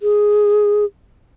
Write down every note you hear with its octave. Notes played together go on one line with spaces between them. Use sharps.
G#4